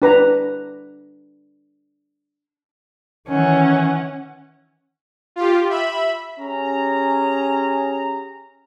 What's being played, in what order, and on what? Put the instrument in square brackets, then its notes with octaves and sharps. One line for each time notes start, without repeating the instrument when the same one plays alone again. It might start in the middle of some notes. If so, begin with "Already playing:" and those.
[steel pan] D4 B4 A#5
[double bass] D#3 E3 [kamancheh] C#4 F#5
[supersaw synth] F4 G4
E5 B5
[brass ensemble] C#4 G4 G#4 A#5